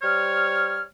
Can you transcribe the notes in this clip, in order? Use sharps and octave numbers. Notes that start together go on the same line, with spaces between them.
G3 C5 C#5 F6